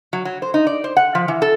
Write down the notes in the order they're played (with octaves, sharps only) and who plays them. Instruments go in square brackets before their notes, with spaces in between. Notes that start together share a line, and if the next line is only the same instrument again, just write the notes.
[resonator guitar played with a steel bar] F#3
F#3
C5
D#4
D5
C5
F#5
F3
E3
A4